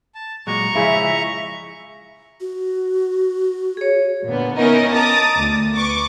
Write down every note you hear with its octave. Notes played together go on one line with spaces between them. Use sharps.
A5
A#2 F#3 G#3 A#5 C#6
C#3 F3 G#3 E4 E5
F#4
G#4 C#5
A#2 D3 B3
B3 C#4 D#4 E4 A#4 D#5
A5 A#5 D6 D#6 A6
D2
B4 C#6 D6